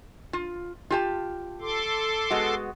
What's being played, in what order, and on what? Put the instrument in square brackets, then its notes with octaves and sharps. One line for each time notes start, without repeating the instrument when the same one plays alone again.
[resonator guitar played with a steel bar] F4
F4 G4 A5
[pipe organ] A4 C6 D6
[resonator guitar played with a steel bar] G#3 B3 F#4